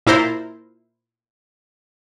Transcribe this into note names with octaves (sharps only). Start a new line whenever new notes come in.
A#2 E4 A#4 C5 A6